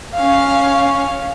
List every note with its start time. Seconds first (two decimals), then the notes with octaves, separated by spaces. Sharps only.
0.15 C#4 F5